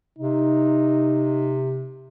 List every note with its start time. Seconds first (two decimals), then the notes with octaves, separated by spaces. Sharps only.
0.19 C3 D#4